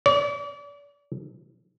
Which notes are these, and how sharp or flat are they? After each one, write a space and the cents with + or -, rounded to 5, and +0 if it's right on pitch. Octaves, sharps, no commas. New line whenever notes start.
D5 -40